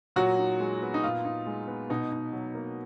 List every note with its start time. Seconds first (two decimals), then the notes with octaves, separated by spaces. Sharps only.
0.16 A#2 F#3 F#4
0.38 D#4
0.60 G#3
0.82 B3
0.94 D#4
1.03 A#2 F4
1.25 D#4
1.46 G#3
1.68 B3
1.90 B2 D#4
2.12 D#4
2.33 F#3
2.55 A#3